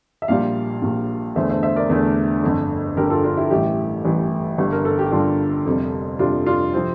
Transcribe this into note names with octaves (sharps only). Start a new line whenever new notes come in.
E5
A#1 A#2 G3 D5 F5
A#1 A#2 G3
E2 D3 A3 C5 E5
C5 E5
C5 E5
A#4 D5
E2 D3 A3
G1 F2 D3
G1 F2 D3 G4 A#4
F4 A4
D4 F4
E4 G4
A1 A2 E3 G3 E4 G4
A1 A2 E3 G3
G1 G2 D3 G3
A#4
A4
G4
G1 G2 D3 G3 D4 F4
F1 F2 C3 G3
F1 F2 C3 G3 D4 F4
D4 F4
C3 F3 C4